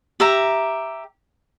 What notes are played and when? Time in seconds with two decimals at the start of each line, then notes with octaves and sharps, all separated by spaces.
0.20 G4 E5 A#5